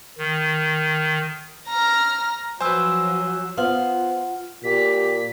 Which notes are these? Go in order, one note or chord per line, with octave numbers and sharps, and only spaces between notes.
D#3
A#5 F6
F3 F#3 B4 C5 G#5 E6
B3 F4 C5 F5 F#5
A#2 G4 B6